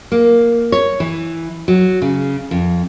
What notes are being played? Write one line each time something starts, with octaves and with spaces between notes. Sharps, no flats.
A#3
C#5
E3
F#3
C#3
F2